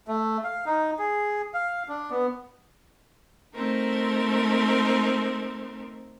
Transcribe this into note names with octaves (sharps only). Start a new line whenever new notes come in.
A3
F5
D#4
G#4
F5
D4
B3
A3 C4 D#4 A#4